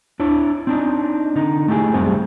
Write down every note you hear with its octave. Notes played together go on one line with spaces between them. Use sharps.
D4 E4 C#5
C4 D4 D#4
D3 D#4
A3 E4 G4 G#4
F#2 G3 A3 C4 G#4 C5